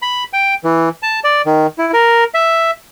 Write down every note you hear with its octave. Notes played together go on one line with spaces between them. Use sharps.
B5
G5
E3
A5
D5
D#3
E4
A#4
E5